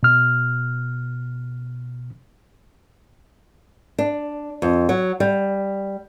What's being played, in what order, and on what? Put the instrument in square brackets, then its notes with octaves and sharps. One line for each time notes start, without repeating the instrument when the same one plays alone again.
[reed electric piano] B2 F6
[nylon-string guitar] D4
F2
F#3
G3